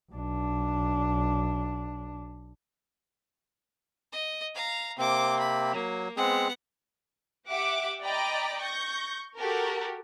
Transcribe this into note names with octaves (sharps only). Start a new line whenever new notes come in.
B1 D4
D#5
F5 A#5
C3 A#3 C4 C5 D6
B5
F#3 A#3
G#3 B3 C4 G#4 F#5
G4 E5 F#5 D6
D5 D#5 G5 A#5 B5 D6
C#6 G6 A#6
F#4 G4 A4 A#4